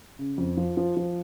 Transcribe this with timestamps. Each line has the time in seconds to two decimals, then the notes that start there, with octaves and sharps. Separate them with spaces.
0.19 C#3
0.38 F2
0.57 F3
0.77 F3
0.97 F3